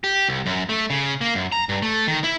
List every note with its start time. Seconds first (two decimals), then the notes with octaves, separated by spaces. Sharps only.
0.04 G4
0.29 C2
0.46 F#2
0.69 A3
0.90 C#3
1.21 A#3
1.35 F#2
1.52 A#5
1.69 G2
1.82 A3
2.07 D#3
2.24 E4